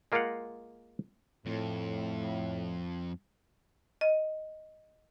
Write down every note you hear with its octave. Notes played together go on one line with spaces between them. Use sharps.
G#3 A#3 F4 A#4 F5 F#5
F2 A2
D#5